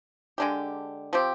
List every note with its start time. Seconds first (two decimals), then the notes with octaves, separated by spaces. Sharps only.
0.38 D3 G#3 D4 G4
1.13 F3 C4 G4